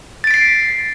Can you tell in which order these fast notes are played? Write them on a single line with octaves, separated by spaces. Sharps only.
A6 D7 B6 C7